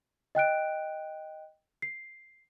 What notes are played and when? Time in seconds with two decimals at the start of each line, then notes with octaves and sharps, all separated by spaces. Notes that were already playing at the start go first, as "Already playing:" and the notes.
0.35 D#5 G5 F#6 D7
1.82 C7